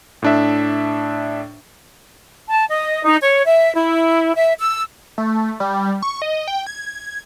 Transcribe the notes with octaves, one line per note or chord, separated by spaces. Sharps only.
A2 D4 E5
A5
D#5
D#4
C#5
E5
E4
E5
E6
A3
G3
C#6
D#5
G5
G#6